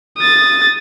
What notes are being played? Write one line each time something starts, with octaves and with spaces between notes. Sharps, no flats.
D#6 A6